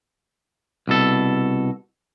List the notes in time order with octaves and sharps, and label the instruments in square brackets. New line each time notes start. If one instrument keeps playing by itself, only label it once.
[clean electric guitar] C2 B2 A4